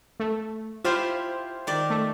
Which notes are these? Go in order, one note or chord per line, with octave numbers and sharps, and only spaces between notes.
A3
E4 F4 G4 C5 E5
D#3 D5
A3